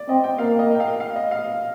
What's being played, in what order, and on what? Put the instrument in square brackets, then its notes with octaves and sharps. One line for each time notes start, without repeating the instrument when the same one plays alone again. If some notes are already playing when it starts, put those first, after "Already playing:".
Already playing: [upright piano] D5
[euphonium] C4 [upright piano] D#5
[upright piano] G5
[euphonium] A#3 [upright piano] F5
[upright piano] D#5
G5
F5
F5
D#5
F5